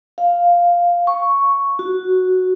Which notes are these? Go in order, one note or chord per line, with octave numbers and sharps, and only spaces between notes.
F5
C#6
F#4